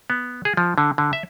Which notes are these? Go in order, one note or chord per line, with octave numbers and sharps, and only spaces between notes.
B3
G#4
F3
D3
D3
E5